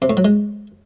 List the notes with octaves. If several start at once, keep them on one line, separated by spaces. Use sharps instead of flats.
C3
A2
F#3
G#3